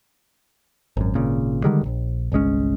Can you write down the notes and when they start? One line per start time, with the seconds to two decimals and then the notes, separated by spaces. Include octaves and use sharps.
0.97 G#1 F#2
1.15 G#1 A#2 C#3
1.64 D3 D#3 G3 G#3
1.81 D#1 A#1
2.32 G1 C2 G#3 C#4